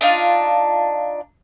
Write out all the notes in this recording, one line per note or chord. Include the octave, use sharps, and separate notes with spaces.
D4 D#4 F4